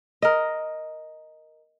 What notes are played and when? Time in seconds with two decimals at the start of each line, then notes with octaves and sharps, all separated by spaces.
0.22 A#4 D#5